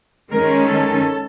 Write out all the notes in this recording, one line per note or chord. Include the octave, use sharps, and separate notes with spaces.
D#3 G#3 C#4 A#4
A4